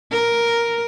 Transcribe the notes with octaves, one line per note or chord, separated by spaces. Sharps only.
A#4